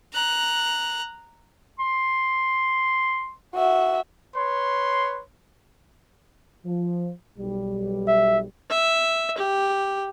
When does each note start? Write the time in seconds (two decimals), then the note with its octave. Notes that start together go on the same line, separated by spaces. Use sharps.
0.13 A#5 F#6
1.79 C6
3.55 F#4 E5
4.34 B4 C#5 C6
6.65 F3
7.38 B1 G3
8.08 E5
8.70 E5
9.38 G4